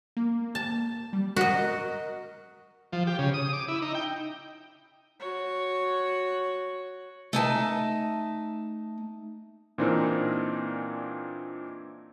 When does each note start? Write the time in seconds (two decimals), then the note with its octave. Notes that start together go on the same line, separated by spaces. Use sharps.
0.17 A#3
0.55 A5
1.13 G3
1.36 F#4 A#4 D#5
2.93 F3
3.07 G4
3.19 C#3
3.34 D#6
3.53 D6
3.68 E4
3.82 D#4
3.95 G5
5.20 F#4 C#5
7.33 A3 D#4 G#5 A5
9.78 A#2 E3 C4 D4 D#4 A#4